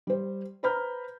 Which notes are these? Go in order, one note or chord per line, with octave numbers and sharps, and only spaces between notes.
G3 C5
B4 C5 A#5 B5 F6 G6